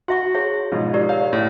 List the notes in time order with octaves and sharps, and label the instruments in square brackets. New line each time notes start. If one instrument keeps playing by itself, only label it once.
[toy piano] F#4 E5 C#6 [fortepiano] F#5
[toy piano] G#4 C#5 E5
[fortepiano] G#2 B2 F3
[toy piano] G4 A#4 D5
[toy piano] A#4 C#5 [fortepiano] F5
[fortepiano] A2